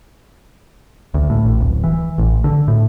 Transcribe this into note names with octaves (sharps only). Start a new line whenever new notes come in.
D2
A2
A1
D1
E3
A1
D3
A2